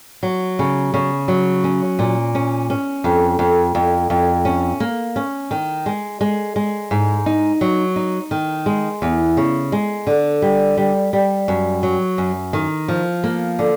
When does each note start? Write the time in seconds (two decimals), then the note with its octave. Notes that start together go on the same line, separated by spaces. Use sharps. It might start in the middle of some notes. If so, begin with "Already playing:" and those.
0.23 F#3
0.59 C#3
0.94 C#3
1.28 F#3
1.64 C#4
1.99 A#2
2.35 C#4
2.70 C#4
3.04 F2
3.39 F2
3.75 F2
4.10 F2
4.45 C#4
4.80 A#3
5.16 C#4
5.51 D#3
5.86 G#3
6.21 G#3
6.56 G#3
6.91 G#2
7.26 D#4
7.61 F#3
7.96 D#4
8.31 D#3
8.66 G#3
9.02 E2
9.37 C#3
9.72 G#3
10.07 D3
10.42 G3
10.77 G3
11.13 G3
11.48 F#2
11.83 F#3
12.18 F#2
12.53 D#3
12.88 F3
13.24 A#3
13.59 D3